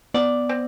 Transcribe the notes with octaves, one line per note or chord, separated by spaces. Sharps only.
B3 D5
C4